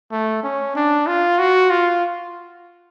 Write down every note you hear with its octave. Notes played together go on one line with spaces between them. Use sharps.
A3
C#4
D4
F4
F#4
F4